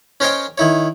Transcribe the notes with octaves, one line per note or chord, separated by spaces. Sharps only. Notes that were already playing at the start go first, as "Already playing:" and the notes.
C#4 A#4 C5 C#5 D#5 G5
D#3 E4 C#5